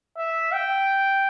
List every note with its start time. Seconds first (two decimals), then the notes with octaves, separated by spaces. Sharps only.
0.18 E5
0.52 G5